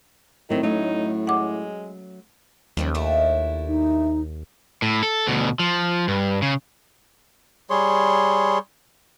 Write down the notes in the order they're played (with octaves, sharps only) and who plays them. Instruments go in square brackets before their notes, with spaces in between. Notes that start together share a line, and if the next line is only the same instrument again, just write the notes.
[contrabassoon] A2 [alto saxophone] D#3 [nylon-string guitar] F#3 C4
[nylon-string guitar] F#3 A3 C#4 [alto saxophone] D#4
[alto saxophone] G#3 [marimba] F#5 D6
[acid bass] D#2 [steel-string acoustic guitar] C#3 F3 G3
[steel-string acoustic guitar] A3 D4 E4
[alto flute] D#4
[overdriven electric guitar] A2
A4
D2 B2
F3
G2
C#3
[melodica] G3 G#4 C#5 C6